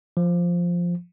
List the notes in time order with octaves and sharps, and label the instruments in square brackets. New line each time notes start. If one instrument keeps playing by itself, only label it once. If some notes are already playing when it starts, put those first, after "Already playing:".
[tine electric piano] F3